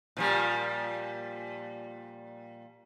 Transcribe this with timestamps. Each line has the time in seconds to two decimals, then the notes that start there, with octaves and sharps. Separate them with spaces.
0.17 A#2 F3 G3